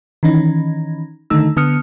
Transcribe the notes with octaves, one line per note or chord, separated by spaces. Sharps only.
D#3 E3 C#4 D#4
D3 D#3 A3 D#4 E6
D3 B3 D#6 F6 C#7